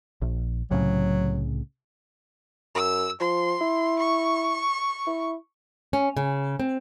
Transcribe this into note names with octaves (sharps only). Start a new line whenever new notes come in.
A#1
C2 A2 C#3 F#3
F#2 E6
F3 C6
E4
C#6
E4
C#4
C#3
C4